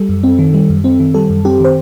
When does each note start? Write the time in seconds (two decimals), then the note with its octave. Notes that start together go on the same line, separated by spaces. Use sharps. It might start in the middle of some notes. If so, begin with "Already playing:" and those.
Already playing: G3 A4
0.09 F#2
0.23 C4
0.39 D#3
0.54 G3
0.70 F#2
0.84 C4
1.00 D#3
1.14 G3 A4
1.30 F#2
1.45 C4 G4
1.60 D#3 C5